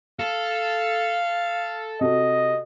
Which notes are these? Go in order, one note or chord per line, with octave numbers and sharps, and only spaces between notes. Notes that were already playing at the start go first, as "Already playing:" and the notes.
A4 F5
C3 F#4 A4 D#5